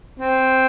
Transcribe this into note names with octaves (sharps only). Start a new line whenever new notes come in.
C4